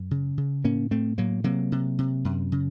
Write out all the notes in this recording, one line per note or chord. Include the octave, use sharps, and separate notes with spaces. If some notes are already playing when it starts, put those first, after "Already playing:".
Already playing: F#2
C#3
C#3
A2 A#3 C#4
A2 A3 C4
A2 F#3 A#3
C3 F#3 A#3
C3
C3
F#2
C#3